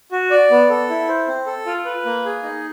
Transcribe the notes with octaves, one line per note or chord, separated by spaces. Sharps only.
F#4
D5
B3
A4
E4
C5
C4
A4
F4
B4
A#3
G#4
D#4